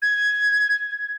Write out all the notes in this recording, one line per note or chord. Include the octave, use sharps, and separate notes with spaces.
G#6